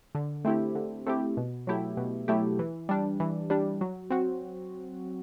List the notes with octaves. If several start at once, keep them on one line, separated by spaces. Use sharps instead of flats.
D3
A3 C4 E4 G4
D3
A3 C4 E4 G4
B2
F#3 A3 E4 G4
B2
F#3 A3 E4 G4
E3
G3 D4
E3
G3 D4
F#3
C4 F#4